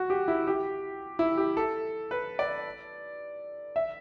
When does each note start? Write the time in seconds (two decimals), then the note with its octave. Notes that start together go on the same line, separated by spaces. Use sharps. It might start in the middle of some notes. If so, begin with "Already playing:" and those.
Already playing: F#4
0.10 G4
0.28 E4
0.47 G4
1.19 E4
1.37 G4
1.57 A4
2.11 B4
2.39 D5
3.76 E5